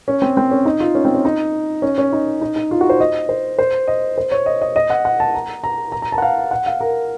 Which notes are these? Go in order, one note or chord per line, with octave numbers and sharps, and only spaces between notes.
C#4
C4
C4
C#4
D#4
F4
C#4
C4
C#4
D#4
C#4
C#4
D#4
D#4
D#4
F4
F#4
C5
D#5
C5
C5
D#5
C5
C#5
D#5
D#5
D#5
F#5
F#5
A5
A#5
A#5
A#5
A#5
A5
F#5
F5
F#5
F5
A#4